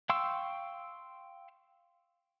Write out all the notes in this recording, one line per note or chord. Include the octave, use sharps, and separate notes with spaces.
F5 G5 C6 C#6 E6